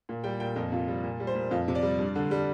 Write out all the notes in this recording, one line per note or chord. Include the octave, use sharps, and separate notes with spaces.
A#2
G3 G5
A#2 G5
F2 A#4
C3 F4
G3
A#2
G3
C5
A#2
F2 F4
C3
D5
G3
G2
D3
G3